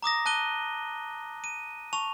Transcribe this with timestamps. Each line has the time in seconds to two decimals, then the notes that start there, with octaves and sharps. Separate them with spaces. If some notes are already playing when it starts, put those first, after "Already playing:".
0.02 A#5 D6 D#6 A#6
0.26 A5 F#6 D#7 G7
1.44 D#7
1.93 A5 C#6 F7